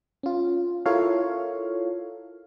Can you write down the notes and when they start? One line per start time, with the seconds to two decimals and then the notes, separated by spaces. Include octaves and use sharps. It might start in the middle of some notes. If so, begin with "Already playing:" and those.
0.23 C#4 F4
0.86 E4 F4 A4 A#4 C#5 F5